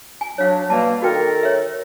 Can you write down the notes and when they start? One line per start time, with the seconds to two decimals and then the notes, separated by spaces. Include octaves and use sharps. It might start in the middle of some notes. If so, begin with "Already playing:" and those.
0.21 G#5
0.38 F#3 D4 C#5 F5
0.70 B2 G3 A#3 A5
1.02 D#3 F#4 A4 A#4 G5
1.43 C#5 E5